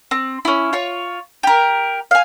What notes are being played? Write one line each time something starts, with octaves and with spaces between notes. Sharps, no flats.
C4
C#4 E4
F4 C#5
G4 A#4
F5 G#5